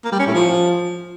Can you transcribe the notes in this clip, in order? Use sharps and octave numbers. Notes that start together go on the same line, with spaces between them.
A#3
G3
C#4
A2
F3